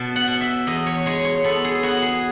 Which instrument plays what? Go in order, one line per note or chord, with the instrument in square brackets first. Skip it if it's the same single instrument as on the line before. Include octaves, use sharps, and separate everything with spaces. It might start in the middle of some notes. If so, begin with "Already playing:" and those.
Already playing: [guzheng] B2 A5
F#5
B2
E5
E2 D#5
C#5
G#3 C#5
C#5
B3 A4
G#4
B3 F#4
G#4